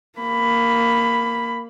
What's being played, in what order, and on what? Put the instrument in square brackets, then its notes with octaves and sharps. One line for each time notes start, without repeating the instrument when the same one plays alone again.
[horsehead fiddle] A#3 B5